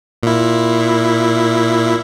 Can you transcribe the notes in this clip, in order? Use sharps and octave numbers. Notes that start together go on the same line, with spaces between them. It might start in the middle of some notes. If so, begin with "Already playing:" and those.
A#2 E4